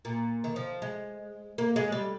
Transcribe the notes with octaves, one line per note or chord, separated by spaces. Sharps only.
A#2
D#3
F3
G#3
A#3
G#3
G3